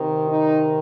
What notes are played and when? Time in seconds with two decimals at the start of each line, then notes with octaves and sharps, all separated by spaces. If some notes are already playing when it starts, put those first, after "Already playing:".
Already playing: C3 D#3
0.28 D#4